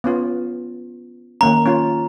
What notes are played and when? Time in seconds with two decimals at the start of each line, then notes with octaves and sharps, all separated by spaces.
0.04 B3 C#4 F4
1.41 D#3 A#3 C#4 A#5
1.66 C#4 F4